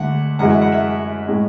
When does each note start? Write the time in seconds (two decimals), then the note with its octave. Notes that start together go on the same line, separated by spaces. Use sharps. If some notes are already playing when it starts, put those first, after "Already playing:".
Already playing: D2 D3 A3 E5 F#5
0.39 F#2 E3 G#3 F#5
0.50 E5
0.61 F#5
0.72 E5
1.28 A2 G#3